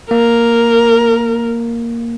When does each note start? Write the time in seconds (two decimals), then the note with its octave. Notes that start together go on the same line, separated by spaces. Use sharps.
0.11 A#3 A#4